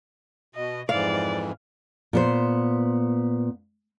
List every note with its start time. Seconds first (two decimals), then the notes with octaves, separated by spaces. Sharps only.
0.55 B2 D#5
0.89 F2 G#2 E3 D5 F5
2.13 A#2 B3 C5